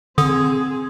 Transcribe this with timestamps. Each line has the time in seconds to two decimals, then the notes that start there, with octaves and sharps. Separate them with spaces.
0.18 D3 C4 G#4 D#6